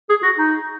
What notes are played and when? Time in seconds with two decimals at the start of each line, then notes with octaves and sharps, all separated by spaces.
0.09 G#4
0.23 F#4
0.38 D#4